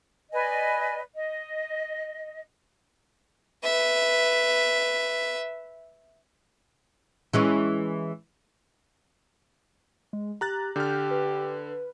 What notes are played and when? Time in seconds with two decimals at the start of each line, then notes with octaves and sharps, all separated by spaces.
0.32 B4 D5 D#5 G#5
1.15 D#5
3.64 B4 E5
7.33 E3 G#3 C#4
10.13 G#3
10.41 G4 A#5 F#6 A6
10.76 D3 G4 F6 G6
11.11 B4